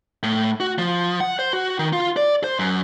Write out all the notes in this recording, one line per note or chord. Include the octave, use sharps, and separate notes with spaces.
A2
F#4
F3
F#5
C5
F#4
D#3
F4
D5
C5
F#2